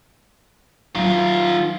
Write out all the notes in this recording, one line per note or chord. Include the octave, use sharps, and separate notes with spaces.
D#3 F#3 E4 F4